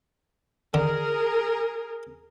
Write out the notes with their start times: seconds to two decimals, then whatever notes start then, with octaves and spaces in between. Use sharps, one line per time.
0.74 D3 G#4 A#4